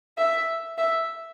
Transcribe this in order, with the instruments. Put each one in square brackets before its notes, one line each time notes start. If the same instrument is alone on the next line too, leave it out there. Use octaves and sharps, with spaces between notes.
[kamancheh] E5
E5